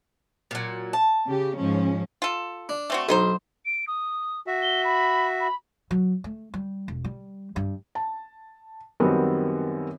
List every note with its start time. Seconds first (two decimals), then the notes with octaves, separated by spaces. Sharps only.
0.51 A#2 F#3
0.93 A5
1.27 C#3 G4
1.57 G#2 F3 C#4
2.22 F4 A4
2.69 D4
2.90 A3 C4 F#4
3.09 B1 D3 D#4 C5
3.65 D7
3.87 D#6
4.47 F#4 E5
4.63 G7
4.84 B5
5.40 B5
5.91 F#3
6.24 A3
6.54 G3
6.88 E1
7.04 G3
7.56 G2
7.95 A5
9.00 F#2 D#3 G3 B3 C4 F#4